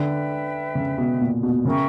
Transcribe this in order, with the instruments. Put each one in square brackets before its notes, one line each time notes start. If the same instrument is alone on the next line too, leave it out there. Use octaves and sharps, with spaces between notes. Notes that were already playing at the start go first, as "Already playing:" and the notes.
Already playing: [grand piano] D3 [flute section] B4 E5 G5
[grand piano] C#3
B2
A#2
B2
[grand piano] C#3 [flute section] A#4 E5 G5 C#6